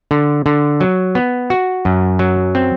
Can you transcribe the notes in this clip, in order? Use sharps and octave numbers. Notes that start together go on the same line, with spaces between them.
D3
D3
F#3
B3
F#4
F#2
F#3
C4